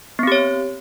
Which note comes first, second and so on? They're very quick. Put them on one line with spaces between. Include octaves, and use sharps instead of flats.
B3 C4 G4 C#5